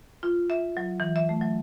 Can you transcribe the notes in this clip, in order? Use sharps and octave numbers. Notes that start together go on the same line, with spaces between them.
F4
E5
F#3
E3
E5
A3
F#3